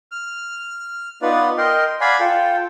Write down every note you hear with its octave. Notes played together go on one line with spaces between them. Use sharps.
F6
B3 D#4 F4 B4 D5 F#5
A#4 D#5 G5 C6
D5 F5 F#5 G#5 B5
F4 A4 G5